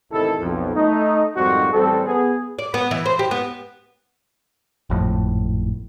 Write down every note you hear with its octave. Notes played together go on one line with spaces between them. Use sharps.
A1 C3 D#3 E4 A4
B1 F2
A3 D#4
F2 G#2 D#3 G3 C4 F#4
A1 G3 C4 A4
B3 G#4
D5
B3
E3
C5
G4
B3
G#1 F2 A2